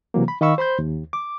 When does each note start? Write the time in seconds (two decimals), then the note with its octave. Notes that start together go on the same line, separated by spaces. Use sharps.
0.14 C3 E3 F#3 A#3
0.28 B5
0.41 D#3 D#5 F5 B5 C#6 E6
0.58 C5 B5 C6 G6
0.79 D#2
1.13 D6